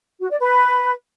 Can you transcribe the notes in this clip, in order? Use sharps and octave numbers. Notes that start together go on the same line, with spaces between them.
F#4
D5
B4